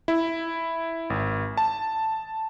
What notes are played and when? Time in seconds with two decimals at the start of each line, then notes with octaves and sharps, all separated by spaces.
0.08 E4
1.10 G#1
1.57 A5